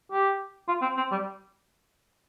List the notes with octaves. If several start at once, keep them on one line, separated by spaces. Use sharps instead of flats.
G4
F4
C4
C4
G3